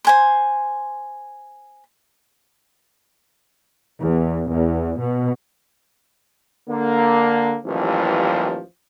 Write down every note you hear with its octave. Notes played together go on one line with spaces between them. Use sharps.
C5 G#5 C6
E2
E2
B2
D3 A#3
A1 D#2 E3 F3 G3